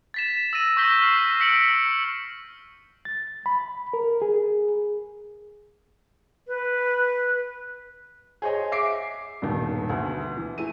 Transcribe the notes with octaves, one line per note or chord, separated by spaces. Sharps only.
A6 B6 E7
E6 A#6 D#7
C#6 E6 G6 A#6 B6 G7
F6 B6 C7 E7
E6 B6 C#7 D7 F#7
A6
B5
A#4
G#4
B4
G#4 C5 C#5 D#5 G#5
E5 D6 C7 D7
D#1 G2 B2 D#3
D2 B2
E3
E3 A3 D#7